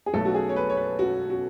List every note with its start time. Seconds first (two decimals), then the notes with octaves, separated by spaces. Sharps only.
0.06 G#4
0.14 B1 B2 A3 A4
0.25 F#4
0.34 G#4
0.49 C#5
0.56 B4
0.70 C#5
0.77 B4
0.99 F#4
1.30 F#4